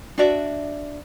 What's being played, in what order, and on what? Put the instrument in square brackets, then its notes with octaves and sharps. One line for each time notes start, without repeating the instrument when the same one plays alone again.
[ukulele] D4 F#4 D5 E5